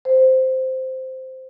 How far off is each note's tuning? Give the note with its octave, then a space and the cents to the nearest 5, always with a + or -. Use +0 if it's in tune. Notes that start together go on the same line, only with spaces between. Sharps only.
C5 -5